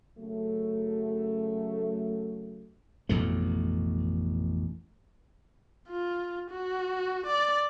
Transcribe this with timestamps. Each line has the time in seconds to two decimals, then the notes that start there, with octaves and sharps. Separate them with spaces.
0.18 F#2 C#3 F#3 A3
3.09 A1 F2 B2 A3
5.89 F4
6.50 F#4
7.26 D5